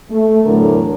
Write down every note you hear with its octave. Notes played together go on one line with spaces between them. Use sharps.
A3
E2 A2 D3 F#3 A#4